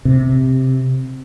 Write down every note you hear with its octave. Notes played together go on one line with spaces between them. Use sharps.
C3